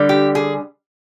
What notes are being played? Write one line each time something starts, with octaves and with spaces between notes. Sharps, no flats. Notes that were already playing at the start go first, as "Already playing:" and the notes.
Already playing: D3 G3
G4
G#4